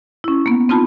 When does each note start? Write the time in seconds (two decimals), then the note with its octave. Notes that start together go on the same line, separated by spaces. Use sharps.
0.24 C#4 E4
0.46 A#3 B3
0.69 C4 D#4 F4 A5 B5